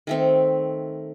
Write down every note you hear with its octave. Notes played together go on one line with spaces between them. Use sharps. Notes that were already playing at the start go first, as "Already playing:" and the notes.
D#3 A3 C4